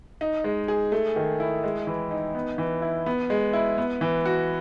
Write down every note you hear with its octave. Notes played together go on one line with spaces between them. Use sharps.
D#4
G#3
G#4
A3
D#3
E4
G#3
E3
D#4
B3
E3
E4
B3
G#3
E4
B3
E3
F#4